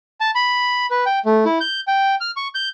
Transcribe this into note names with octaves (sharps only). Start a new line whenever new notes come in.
A5
B5
B4
G5
A3
E4
G6
G5
F6
C#6
G6